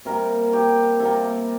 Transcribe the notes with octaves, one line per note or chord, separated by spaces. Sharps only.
C3 G3 A#3 A#4
G4
C3 G3 A#3 A4